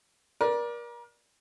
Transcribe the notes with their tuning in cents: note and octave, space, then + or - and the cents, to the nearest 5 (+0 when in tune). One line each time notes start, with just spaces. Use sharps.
A#4 +35 D5 +0